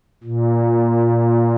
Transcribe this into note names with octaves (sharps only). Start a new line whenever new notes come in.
A#2